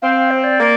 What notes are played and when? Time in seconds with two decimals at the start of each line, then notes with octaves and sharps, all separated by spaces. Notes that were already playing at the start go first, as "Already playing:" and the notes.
0.02 C4 F5
0.31 C5
0.44 D5
0.59 A#3